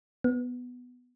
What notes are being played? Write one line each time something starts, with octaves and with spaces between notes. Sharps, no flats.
B3